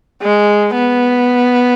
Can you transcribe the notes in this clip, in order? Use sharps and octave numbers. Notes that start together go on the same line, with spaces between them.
G#3
B3